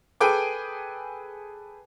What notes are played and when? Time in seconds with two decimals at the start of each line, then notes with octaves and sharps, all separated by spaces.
0.20 G#4 A4 B4 G5 G#5 D6